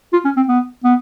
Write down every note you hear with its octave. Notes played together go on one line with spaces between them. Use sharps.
F4
C#4
C4
B3
B3